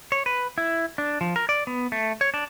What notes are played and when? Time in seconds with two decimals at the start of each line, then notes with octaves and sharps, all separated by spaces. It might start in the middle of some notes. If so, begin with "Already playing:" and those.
0.12 C#5
0.26 B4
0.58 E4
0.98 D4
1.21 F3
1.36 A#4
1.49 D5
1.67 B3
1.92 A3
2.21 C#5
2.34 D4